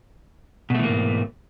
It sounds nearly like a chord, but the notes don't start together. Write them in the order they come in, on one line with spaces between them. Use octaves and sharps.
B2 A3 E3 A#3 G#2